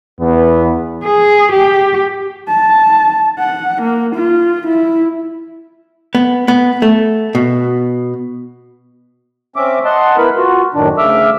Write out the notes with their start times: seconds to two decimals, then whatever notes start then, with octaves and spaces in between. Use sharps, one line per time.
0.21 E2 B3
1.05 G#4
1.52 G4
2.48 A5
3.39 F#5
3.82 A#3
4.15 F4
4.67 E4
6.15 B3
6.48 B3
6.82 A3
7.35 B2
9.56 C4 C#4 E5 D6
9.85 D#5 F#5 A5 C6
10.17 B3 E4 A#4 B4 B5
10.36 F4 F#4
10.74 F#2 A2 D#3 D4
10.98 D2 C#3 E5 D6 E6 F6